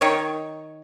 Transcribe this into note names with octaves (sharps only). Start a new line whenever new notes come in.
D#3 C#5